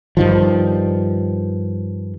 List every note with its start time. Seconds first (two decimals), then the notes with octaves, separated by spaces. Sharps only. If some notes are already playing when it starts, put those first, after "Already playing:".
0.17 G2 D#3 F3